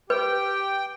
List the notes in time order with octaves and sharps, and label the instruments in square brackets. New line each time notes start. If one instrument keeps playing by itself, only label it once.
[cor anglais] G4 [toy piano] B4 [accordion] G5